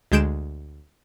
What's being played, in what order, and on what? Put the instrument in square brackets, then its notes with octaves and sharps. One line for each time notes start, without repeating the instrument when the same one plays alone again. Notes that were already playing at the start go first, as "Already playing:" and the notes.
[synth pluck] D2 G#3 G6 D7 E7